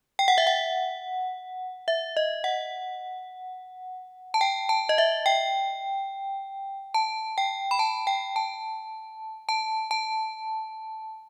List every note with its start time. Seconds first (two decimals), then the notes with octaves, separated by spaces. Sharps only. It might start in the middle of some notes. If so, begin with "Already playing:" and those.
0.19 G5
0.28 F#5
0.38 E5
0.47 F#5
1.88 E5
2.17 D#5
2.44 F#5
4.34 A5
4.41 G5
4.69 A5
4.89 D#5
4.98 E5
5.26 G5
6.94 A5
7.38 G5
7.71 B5
7.79 A5
8.07 G5
8.36 A5
9.49 A5
9.91 A5